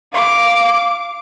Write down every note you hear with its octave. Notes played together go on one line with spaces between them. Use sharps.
F5 D6